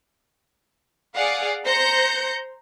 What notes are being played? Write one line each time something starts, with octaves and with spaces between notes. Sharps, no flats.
G#4 D5 F5 F#5
C5 A#5 G6 A#6 C#7